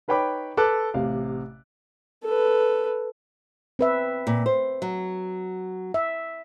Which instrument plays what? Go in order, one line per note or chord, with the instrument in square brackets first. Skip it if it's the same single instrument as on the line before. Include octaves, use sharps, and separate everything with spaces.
[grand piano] D#4 B4 C#5 G5 B5 D6
A4 B4 D6 F#6
A1 C3 F5
[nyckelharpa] A4 B4
[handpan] C4 B4 E5
[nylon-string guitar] A#2
C5
F#3
[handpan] E5